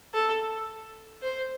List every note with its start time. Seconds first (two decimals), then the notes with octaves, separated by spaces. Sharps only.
0.14 A4
1.22 C5